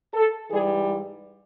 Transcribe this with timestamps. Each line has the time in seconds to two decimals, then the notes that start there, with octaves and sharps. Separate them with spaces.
0.14 A4
0.49 G#2 E3 G3 G#4